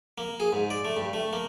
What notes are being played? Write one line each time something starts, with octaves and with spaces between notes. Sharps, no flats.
A#3
G#4
G#2
D5
A3
G2
A3
A#3